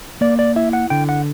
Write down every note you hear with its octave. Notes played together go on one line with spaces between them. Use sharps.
A#3 D5
D5
E4 E5
F#5
D3 G5
F#5